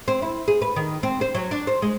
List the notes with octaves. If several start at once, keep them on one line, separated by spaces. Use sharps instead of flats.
C4
E4
G#4
B4
D#3
C4
C5
F#3
D4
C5
G#3